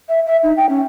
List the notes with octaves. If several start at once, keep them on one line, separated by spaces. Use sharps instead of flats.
E5
E5
D#4
G5
C#4